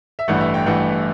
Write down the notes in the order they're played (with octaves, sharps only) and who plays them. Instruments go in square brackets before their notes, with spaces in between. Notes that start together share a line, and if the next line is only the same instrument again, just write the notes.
[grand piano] E5
A1 G2 E3 A3 F#5
E5
G5
A1 G2 E3 A3 F#5